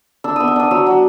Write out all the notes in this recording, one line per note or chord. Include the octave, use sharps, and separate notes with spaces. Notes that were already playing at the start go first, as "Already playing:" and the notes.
D4 E6
B3 D#6
E6
D4 D#6
F#3 E6
F#3